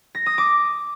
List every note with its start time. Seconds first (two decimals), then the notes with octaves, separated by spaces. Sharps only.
0.15 A#6
0.26 D#6
0.38 D6